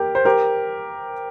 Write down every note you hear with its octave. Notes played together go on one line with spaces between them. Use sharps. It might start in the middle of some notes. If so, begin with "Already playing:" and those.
Already playing: G4 A#4
C5
G4 A#4